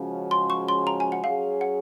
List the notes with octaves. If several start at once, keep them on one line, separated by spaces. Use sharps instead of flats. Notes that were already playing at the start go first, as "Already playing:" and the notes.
Already playing: C#3 F3 G#3 C#4 F#4
C6
C#6
C6
A#5
G#5
F#5
F#3 C#4 G#4 F5
F#5